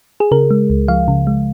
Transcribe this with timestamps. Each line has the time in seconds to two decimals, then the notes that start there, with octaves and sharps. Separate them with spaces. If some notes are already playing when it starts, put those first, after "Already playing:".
0.20 G#4
0.31 C#3 A#4
0.50 G#3
0.70 C#2
0.88 F3 F5
1.08 C#3
1.27 G#3